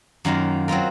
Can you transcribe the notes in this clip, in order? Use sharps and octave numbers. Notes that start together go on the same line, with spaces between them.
F#2 D#3 A#3 F4 A#4
F#3 C4 F4 A#4